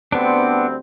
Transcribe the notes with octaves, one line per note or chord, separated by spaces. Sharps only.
D2 G3 B3 C4 D4